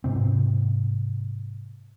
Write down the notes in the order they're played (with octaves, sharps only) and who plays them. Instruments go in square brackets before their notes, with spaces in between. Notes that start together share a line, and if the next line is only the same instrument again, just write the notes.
[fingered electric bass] G#2 C3 C4